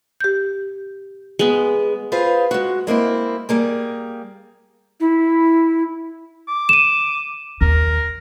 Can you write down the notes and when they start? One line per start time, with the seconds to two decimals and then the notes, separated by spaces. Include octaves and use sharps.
0.20 G4 G6
1.39 G#3 B3
2.12 F4 G#4 B4 C5 F5
2.51 G#3 F#4
2.87 G#3 A#3 C4 E4
3.49 G3 A#3 G#4
5.00 E4
6.48 D6
6.69 D#7 E7
7.61 D#2 D#3 A#4